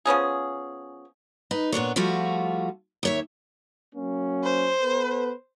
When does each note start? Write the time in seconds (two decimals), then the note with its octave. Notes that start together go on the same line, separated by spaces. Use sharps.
0.05 F3 B3 C#4 G#4
1.51 D#4 B4
1.72 A#2 B3 D4 C#5
1.96 F3 G3 A3 F4 F#4
3.03 D#2 C#5 E5
3.95 F#3 A#3 C#4
4.43 C5
4.82 B3 A4 B4